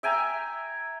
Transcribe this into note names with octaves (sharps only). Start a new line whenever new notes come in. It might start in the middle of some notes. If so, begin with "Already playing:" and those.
E5 G5 G#5 A#5